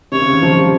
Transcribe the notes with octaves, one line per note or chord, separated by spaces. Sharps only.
C3 C#5
C#3
D#3
F3
G3